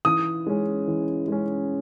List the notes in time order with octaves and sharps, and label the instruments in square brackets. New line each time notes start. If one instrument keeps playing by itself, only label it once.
[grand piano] E3 D#6
G#3 C#4
E3
G#3 C#4